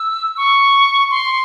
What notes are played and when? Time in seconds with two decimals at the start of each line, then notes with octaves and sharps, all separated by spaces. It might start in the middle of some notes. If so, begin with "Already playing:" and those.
Already playing: E6
0.37 C#6
1.11 C6